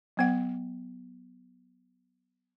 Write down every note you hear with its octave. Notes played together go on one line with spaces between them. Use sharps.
F#3 B3 F#5